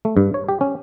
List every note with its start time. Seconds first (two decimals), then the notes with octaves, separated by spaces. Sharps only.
0.05 A3
0.17 G2
0.34 C#5
0.49 G4
0.61 C#4